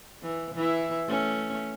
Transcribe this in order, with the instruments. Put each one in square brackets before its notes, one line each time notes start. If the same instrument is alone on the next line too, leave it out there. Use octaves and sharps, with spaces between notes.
[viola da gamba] E3
E3 E4
A3 C#4